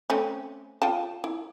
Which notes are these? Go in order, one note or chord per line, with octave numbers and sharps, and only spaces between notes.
A3 C4 C#4
F4 G5 A5
E4